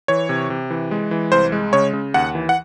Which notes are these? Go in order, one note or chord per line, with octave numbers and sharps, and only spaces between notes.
E3 C#5
C3
C3
E3
G#3
E3
C2 C5
G#3
C#3 C#5
C#3
D#2 F#5
E3
F#5